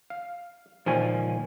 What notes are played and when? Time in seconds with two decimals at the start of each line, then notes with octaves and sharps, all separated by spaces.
0.10 F5
0.86 C#2 A#2 D#3 F3 F4 G#5